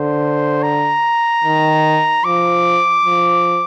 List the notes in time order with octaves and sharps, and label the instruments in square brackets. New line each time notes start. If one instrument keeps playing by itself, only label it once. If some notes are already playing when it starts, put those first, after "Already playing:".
Already playing: [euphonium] D3 [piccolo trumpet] C5
[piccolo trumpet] A#5
[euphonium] D#3
[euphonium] F3 [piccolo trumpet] D6
[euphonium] F3